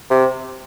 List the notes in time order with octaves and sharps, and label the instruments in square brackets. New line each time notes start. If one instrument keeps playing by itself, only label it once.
[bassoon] C3